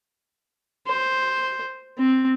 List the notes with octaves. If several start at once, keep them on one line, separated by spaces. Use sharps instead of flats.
C5
C4